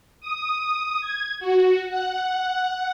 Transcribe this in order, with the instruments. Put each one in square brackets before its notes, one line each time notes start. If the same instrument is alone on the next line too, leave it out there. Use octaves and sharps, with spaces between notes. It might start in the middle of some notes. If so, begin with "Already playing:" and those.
[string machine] D#6
G#6
F#4
F#5